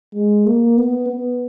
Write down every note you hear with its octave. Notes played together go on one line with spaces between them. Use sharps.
G#3
A#3
B3
B3